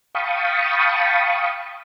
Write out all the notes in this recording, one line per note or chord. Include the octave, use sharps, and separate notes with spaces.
F5 G5 A5 B5 C#6 D#6